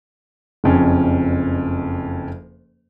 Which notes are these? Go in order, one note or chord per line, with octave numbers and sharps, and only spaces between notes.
F#1 F2 C#4